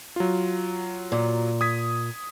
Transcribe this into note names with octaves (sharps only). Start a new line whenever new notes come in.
F#3 F4
A#2
D#6 G#6 B6